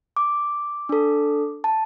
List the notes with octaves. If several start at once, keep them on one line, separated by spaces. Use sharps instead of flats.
D6
D4 A4
A5